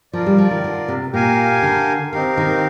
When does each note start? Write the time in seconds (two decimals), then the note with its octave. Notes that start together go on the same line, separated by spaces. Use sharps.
0.13 F3 F4 A#4 D5
0.26 G3
0.38 F3
0.51 D#3
0.64 D3
0.88 C3
1.13 A#2 G4 A#4 F5 G#5
1.63 D3
2.12 D#3 C4 D#4 G4 A#4 F5
2.38 D#3